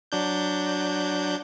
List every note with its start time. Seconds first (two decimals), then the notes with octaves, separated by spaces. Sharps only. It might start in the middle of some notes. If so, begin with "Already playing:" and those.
0.12 F#3 D4 G6